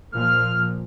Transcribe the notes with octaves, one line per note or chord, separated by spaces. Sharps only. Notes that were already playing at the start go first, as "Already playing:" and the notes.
A#2 F3 F6